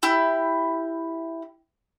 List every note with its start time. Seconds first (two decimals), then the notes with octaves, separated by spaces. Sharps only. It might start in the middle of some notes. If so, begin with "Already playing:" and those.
0.03 E4 G4